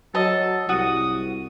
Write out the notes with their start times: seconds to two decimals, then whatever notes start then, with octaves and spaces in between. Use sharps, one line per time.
0.15 F#3 A4 D#5 A5
0.69 C2 F#4 D#6